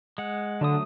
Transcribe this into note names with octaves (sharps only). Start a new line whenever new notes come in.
G#3 F#5
D3 F#3 A3 D#6